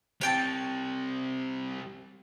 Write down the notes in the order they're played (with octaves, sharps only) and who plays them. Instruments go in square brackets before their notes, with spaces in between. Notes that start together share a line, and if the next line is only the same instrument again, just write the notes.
[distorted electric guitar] G3 C4 [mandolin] C#5 G5 A5